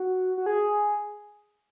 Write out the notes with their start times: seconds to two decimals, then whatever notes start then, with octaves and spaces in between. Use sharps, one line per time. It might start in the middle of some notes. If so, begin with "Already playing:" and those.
Already playing: F#4
0.38 F#4
0.46 G#4